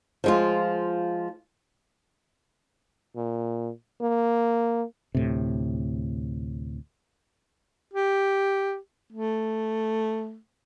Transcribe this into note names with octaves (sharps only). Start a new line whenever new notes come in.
F3 G#3 F4
A#2
A#3
D2 A2 C3
G4
A3